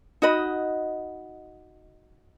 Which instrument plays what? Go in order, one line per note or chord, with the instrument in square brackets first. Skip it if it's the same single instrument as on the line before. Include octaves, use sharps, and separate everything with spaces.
[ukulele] D#4 F#4 D#5 B5